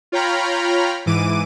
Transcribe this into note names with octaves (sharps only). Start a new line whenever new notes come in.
F4 C#5 G5 A#5 B5 F6
G#2 E3 D6 D#7